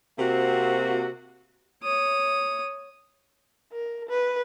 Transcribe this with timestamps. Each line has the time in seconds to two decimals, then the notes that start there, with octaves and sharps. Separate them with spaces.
0.19 C3 A#3 C4 F#4
1.83 C#5 D#6
3.72 A#4
4.09 B4